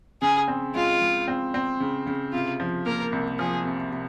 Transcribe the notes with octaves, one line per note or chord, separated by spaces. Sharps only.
C#3 G#4
C4
G#3 F4
G#3
C4
C4
C#3
C#3
C3 F4
F3
A#3 A#4
C2
F3 G#4
C3
C3